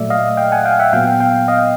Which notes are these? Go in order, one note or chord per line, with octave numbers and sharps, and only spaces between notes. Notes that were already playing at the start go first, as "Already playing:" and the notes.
Already playing: A#2 F#3 A3 D5 E5
D#5 F5
F5 G5
F#5 G#5
F5 G5
E5 F#5
A#2 F#3 B3 F5 G5
F5 G5
D#5 F5